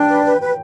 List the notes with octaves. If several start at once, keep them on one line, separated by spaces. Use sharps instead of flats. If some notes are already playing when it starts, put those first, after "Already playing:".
Already playing: D4 G5
B4
B4
B4